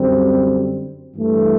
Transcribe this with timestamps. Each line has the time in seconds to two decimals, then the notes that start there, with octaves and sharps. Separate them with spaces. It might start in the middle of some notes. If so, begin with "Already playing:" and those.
Already playing: F#2 D3 G3 C4
1.16 G2 E3 A3